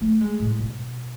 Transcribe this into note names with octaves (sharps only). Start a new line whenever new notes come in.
A3
G#3
A2
B2